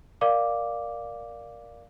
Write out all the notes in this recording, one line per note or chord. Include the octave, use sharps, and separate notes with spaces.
A#4 D5 F5 D6